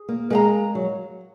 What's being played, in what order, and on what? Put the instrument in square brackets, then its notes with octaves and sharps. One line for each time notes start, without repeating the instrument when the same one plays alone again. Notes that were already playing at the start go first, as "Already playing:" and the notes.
Already playing: [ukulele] G#4
[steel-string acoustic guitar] A#3
[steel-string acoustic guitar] G#3 [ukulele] A#4 F5 A#5
[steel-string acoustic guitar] F#3